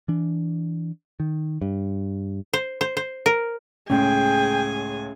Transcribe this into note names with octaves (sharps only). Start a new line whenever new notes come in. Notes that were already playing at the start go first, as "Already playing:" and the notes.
E3 D4
D#3
G2
C5
C5
C5
A#4
C#2 A2 G#3 C#4 G#4 G5 G#5